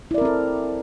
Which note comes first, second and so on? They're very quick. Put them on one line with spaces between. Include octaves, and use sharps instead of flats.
E4 D5 A#4 C4 A4